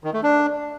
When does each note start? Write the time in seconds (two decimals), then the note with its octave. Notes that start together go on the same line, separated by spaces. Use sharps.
0.04 D#3
0.14 A3
0.23 D4